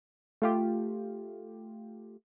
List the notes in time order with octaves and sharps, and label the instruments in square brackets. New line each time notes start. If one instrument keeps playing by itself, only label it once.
[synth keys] A3 F4 G4